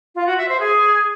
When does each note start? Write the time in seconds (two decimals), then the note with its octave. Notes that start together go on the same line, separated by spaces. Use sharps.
0.15 F4
0.26 F#4
0.38 E5
0.49 C5
0.60 G#4